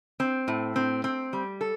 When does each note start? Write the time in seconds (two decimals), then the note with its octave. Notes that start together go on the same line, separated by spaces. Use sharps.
0.20 C4
0.48 A2
0.76 C4
1.04 C4
1.33 G3
1.61 A4